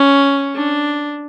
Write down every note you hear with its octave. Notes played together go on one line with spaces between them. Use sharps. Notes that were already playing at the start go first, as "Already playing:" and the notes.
Already playing: C#4
D4